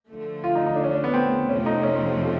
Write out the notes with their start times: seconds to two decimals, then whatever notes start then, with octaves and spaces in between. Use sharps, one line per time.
0.09 D3 F3 A3
0.44 F4
0.55 D#4
0.66 D#4
0.76 D4
0.84 C#4
0.91 D4
1.04 B3
1.14 C4
1.48 F2 C3 F3 A3 C#4
1.66 D#4
1.83 C#4